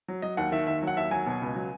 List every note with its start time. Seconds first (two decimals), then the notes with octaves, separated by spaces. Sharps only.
0.08 F#3
0.22 F#3 D#5
0.37 D#2 F#5
0.52 D#3 E5
0.67 D#2 E5
0.82 F#3
0.87 F#5
0.97 D#2 E5
1.11 F#3 G#5
1.26 B2
1.42 C#2
1.55 F#3